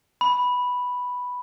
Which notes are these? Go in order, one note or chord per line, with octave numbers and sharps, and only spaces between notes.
B5